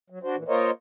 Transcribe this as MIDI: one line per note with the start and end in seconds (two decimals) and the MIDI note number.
0.10 0.19 54
0.23 0.36 62
0.23 0.36 66
0.23 0.36 72
0.36 0.44 46
0.36 0.44 52
0.48 0.71 58
0.48 0.71 65
0.48 0.71 70
0.48 0.71 72
0.48 0.71 73
0.48 0.71 75